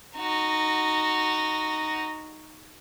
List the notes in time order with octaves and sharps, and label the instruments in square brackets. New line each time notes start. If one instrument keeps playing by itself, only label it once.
[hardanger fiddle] D#4 F#4